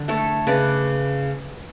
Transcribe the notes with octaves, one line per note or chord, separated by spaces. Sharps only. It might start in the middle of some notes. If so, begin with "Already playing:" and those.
Already playing: D3
A3 A4 C#5
C#3 B4 D5